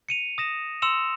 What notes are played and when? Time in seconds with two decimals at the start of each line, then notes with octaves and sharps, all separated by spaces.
0.09 C#7 D#7 F7
0.38 D#6 A#6 E7
0.82 C6 E6 C#7 E7 F7